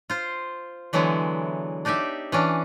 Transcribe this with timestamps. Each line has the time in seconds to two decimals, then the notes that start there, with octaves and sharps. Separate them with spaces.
0.10 F4 C5
0.93 D3 E3 F#3 G#3 B3 E4
1.85 D4 D#4 G4 D5 E5
2.32 E3 C#4 D4